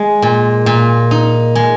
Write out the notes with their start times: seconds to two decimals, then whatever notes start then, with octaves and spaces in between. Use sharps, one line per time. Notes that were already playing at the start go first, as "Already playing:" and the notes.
Already playing: G#3
0.22 A#2
0.66 A#2
1.11 D#4
1.55 G#3